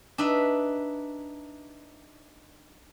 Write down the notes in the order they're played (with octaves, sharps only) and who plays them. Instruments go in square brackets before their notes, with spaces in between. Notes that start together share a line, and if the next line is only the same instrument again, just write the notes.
[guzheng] D4 D#4 B4 E5